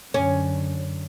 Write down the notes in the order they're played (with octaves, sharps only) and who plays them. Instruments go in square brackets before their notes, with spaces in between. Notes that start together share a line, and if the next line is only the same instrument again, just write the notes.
[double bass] F#2 D3 [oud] C#4